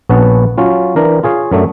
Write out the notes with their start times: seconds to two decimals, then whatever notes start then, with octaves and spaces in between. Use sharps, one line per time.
0.09 A#1 B3 C#4 B4 F#5 A5
0.58 F#3 C#4 F4
0.96 E3 D4 A#4
1.23 F4 G#4 C#5 F5
1.52 F#2 F#3 A3 D4